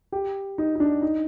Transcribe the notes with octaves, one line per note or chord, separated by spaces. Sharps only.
G4
D#4
D#4
D4
D#4